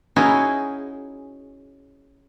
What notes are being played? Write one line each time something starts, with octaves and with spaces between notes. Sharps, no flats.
C#4 D#4 E4 F#4 G#4